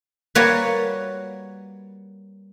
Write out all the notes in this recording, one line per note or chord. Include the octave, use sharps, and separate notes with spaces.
G3 A#3 F#4 B4 C#5